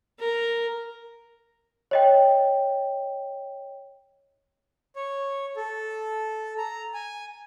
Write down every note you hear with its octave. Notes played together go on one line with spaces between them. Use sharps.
A#4
C#5 D#5 G5
C#5
A4
A#5
G#5